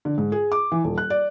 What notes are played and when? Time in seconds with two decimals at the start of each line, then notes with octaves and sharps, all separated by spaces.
0.05 D3
0.18 G#2
0.32 G#4
0.52 D6
0.72 E3
0.84 D#1
0.98 F#6
1.10 D5